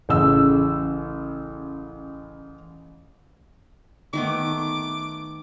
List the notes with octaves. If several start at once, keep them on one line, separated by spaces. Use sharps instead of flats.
A1 C#3 E6
D#3 A3 B3 D6